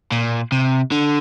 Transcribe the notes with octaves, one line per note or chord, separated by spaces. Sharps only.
A#2
C3
D3